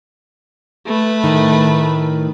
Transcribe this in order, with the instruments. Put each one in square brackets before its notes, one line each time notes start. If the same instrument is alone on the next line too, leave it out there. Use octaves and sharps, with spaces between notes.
[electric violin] A3 B4
[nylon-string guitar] A2 D#3